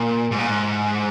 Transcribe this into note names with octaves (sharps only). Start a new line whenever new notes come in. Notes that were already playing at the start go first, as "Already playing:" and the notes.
Already playing: A#2
G#2
A#2
G#2